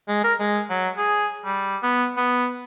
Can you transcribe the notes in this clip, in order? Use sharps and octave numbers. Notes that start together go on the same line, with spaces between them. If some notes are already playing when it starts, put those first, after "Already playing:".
G#3
A#4
G#3
F#3
G#4
G3
B3
B3